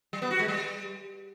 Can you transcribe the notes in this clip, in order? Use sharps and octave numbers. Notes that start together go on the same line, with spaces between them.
G3
B3
F#4
G#3
G3